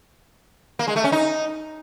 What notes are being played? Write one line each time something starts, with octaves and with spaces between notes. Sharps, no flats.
A#3
G#3
A3
C#4
D#4